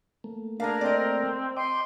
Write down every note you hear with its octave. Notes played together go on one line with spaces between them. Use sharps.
A3 A#3
D4 G#4 A#4 F5
C4 D5 D#5
D#5 G5 C6 D6